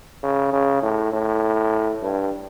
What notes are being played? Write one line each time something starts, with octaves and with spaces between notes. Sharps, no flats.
C#3
C#3
A2
A2
G2